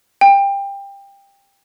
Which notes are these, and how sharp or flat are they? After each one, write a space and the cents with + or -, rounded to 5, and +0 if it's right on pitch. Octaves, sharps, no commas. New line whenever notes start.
G5 +20